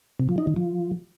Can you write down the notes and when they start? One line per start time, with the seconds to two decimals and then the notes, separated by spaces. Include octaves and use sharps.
0.20 C3
0.29 F3
0.38 D#4
0.47 D#3
0.56 F3